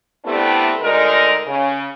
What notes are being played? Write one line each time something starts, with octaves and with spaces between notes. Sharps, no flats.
G3 A3 B3 C4 D4 E4
D2 D3 G#3 D#4 A#4
C#3